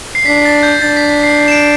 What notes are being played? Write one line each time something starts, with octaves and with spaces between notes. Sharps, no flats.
C7
D4 B6
A6
G6
D4 A6
B6
B6
C7
C7
E7
D7